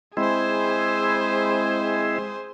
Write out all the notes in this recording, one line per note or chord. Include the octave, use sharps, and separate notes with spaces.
G#3 C4 E4 G#4 C5